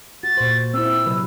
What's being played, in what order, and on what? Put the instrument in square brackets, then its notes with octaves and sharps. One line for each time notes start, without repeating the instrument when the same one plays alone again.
[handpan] F#4 [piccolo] A6
[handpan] A#2 C5
[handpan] C4 E4 [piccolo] E6
[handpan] C3 F#3 B4